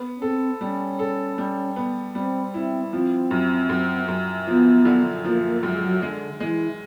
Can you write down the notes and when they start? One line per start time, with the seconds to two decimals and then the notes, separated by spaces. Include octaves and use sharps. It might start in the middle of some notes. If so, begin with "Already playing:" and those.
Already playing: B3
0.16 C#4
0.22 C4 A4
0.61 G3 C#4
0.99 A4
1.38 G3
1.76 B3
2.15 G3 C4
2.54 C4 E4
2.93 F3 C4
3.31 F#2
3.69 F#2
4.08 F#2
4.47 F3 B3
4.85 D3
5.24 F3 A#3
5.44 A#3
5.63 F#2 G#3
5.83 F#3
6.02 D3 G#3
6.40 E3 G#3